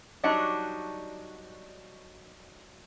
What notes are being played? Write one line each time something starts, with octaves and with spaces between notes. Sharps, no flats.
F#3 G3 D4 D#4 F#4